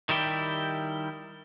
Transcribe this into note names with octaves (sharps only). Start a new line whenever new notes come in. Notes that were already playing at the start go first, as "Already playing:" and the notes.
D#3 G3 E4 G4